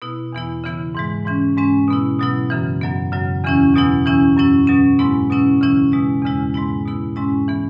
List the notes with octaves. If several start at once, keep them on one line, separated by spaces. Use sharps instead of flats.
B2 B3 E4
E2 E3 B3 E4
C#3 E3 B3 E4
G#2 E3 G#3
G#2 E3 C#4
G#2 G#3 C#4
B2 B3 E4
B2 F#3 B3 E4
F#2 C#3 E3
F#2 F#3 B3
F#2 C#3 F#3
E2 C#3 E3 C#4 E4
E2 B2 F#3 B3 E4
E2 E3 C#4 E4
F#2 F#3 C#4 E4
B2 F#3 C#4
G#2 G#3 B3 E4
B2 F#3 C#4 E4
C#3 E3 C#4 E4
B2 G#3 E4
E2 C#3 G#3 E4
G#2 G#3 B3 E4
B2 B3 E4
G#2 G#3 C#4 E4
E3 B3